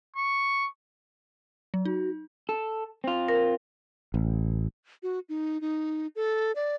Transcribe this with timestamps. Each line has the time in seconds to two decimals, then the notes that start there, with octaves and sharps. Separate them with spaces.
0.16 C#6
1.74 F#3
1.85 D#4 F#4
2.49 A4
3.04 C4 F4
3.28 A#4
4.14 A1
5.03 F#4
5.29 D#4
5.61 D#4
6.16 A4
6.56 D5